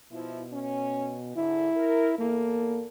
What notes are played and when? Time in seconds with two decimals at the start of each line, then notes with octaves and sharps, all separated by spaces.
0.12 B2 F3 E4
0.53 C#4
1.36 G#2 D3 E4
1.76 A#4
2.19 E2 A#3 A4